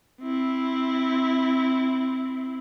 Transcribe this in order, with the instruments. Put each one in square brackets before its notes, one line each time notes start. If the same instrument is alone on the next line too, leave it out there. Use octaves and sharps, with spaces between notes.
[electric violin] C4 E4